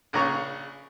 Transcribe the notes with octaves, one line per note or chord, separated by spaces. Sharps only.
A#1 C#3 C#4 A#5 C#6